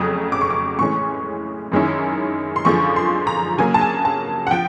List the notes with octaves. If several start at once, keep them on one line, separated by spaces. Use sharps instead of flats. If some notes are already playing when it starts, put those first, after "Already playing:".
Already playing: F2 C#3 F#3 A3 D#6
D6
C#6
D6
A2 E3 G#3 C#4 C#6
F#2 D#3 G#3 C#4 E4
C6
F#2 D3 F3 G#3 C#6
C6
A#5
C#3 F#3 A#3 G#5
A5
G#5
A5
F#5
F3 G5